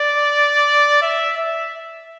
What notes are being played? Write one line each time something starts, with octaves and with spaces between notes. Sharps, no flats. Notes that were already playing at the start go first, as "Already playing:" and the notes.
Already playing: D5
E5
E5